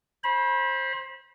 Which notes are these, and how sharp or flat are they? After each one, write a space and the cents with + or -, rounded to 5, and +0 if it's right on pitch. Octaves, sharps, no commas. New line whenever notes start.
C5 +20 B5 -30